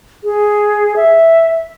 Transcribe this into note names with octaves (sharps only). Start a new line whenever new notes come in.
G#4
E5